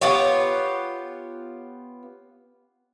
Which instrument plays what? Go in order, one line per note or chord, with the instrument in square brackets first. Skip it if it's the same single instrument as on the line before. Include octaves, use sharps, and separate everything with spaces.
[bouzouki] B3 F4 G4 C#5